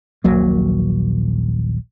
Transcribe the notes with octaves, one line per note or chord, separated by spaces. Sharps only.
D#1 A#1 F#3 A#3